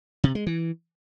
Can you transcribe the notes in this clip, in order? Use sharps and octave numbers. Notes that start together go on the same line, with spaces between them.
C3
G#3
E3